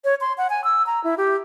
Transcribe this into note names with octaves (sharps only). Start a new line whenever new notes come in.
C#5
C6
F#5
G#5
E6
A#5
E4
G4